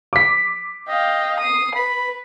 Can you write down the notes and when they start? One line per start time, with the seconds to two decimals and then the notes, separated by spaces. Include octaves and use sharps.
0.13 D6 B6
0.88 D#5 F5 G5
1.40 D#6 C7
1.75 B4 B5